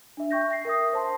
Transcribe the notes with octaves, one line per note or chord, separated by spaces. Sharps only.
D4 E5
E5 G5 C#6 G6 A#6
A#6 C7
A#4 E5 D#6
C5 A5 C6